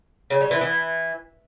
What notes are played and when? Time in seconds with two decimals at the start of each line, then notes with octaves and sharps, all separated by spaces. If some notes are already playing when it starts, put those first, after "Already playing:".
0.30 C#3
0.41 G3
0.51 E3
0.61 E3